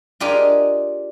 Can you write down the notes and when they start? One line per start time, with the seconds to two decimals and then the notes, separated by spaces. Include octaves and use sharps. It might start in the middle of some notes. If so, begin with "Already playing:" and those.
0.20 D4 F4 G4 G#4 A#4 D#5